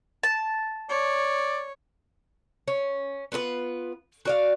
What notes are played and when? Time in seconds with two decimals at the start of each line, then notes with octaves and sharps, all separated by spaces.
0.23 A5
0.90 C#5 D5
2.68 C#4
3.32 B3 F4 G#4 B4
4.25 F#4 D5 F5